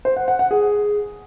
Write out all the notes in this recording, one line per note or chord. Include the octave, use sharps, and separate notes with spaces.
C5
F#5
F#5
F#5
G#4